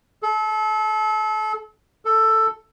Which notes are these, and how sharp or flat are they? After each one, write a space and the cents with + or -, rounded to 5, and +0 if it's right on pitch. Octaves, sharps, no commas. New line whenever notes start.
A4 -30
A4 +10